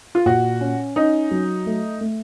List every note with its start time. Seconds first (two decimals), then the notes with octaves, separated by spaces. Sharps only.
0.15 F4
0.26 A#2 F#4
0.61 C#4
0.96 C#4 D#4
1.31 F#3
1.66 A3
2.01 A3